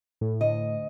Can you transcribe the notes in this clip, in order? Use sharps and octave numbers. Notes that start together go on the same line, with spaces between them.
A2
D2 D#5